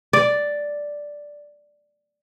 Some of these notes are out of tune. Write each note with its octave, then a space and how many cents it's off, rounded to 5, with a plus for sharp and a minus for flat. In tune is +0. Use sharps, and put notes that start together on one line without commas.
D5 +0